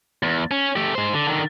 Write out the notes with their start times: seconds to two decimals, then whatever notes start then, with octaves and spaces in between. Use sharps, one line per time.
0.23 E2
0.51 C#4
0.76 A3 G4
0.95 G#2 C5
1.13 D3
1.28 D3 D#3